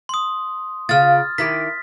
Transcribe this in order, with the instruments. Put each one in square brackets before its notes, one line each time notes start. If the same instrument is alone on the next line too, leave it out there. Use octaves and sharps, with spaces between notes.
[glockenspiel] C6 D#6
[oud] C#3 F4 [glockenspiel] F6 A6
[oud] D#3 E4 G4 [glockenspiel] B6